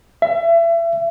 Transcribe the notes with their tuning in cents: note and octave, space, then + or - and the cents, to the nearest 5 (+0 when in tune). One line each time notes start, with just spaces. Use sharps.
E5 +30